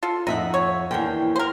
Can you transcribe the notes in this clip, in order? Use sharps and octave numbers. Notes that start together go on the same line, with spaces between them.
F4 A4
F2 D#4 E5 F#5
C#5
E2 D3 A#3 G5
A#4 C5